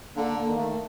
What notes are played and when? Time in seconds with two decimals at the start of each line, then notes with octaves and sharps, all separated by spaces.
0.16 D3 A#3
0.37 A#3
0.47 D#3
0.58 A3